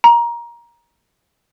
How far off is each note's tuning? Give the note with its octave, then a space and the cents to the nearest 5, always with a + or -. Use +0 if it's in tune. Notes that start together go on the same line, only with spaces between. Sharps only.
A#5 +20